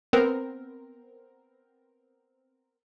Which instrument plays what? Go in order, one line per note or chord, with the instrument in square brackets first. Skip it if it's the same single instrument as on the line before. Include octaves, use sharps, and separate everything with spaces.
[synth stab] B3 C4 A#4